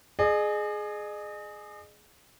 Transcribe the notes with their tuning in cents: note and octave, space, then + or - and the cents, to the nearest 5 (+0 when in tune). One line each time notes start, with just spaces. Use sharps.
G#4 +15 D#5 -40